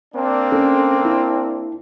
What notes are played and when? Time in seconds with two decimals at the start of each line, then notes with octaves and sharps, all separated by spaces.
0.14 A#3 C4 D4
0.52 C#4 A4
1.05 E4